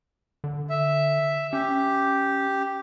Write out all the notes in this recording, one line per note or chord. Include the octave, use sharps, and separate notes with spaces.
D3
E5
C#4 G4